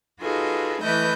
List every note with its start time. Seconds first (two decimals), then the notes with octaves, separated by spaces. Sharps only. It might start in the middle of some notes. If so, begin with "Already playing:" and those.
0.22 D#4 F4 F#4 G#4 A4 B4
0.82 E3 A3 E4 B4 D#5 G6